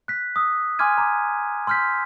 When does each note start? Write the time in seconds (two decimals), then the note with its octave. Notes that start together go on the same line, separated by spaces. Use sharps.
0.08 F#6 B6
0.36 D#6 E6
0.79 G#5 C6 D6 F6 G#6 D#7
0.98 A#5 D6
1.67 C6 E6 F6 G6 B6